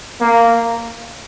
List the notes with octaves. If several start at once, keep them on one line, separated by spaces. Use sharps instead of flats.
A#3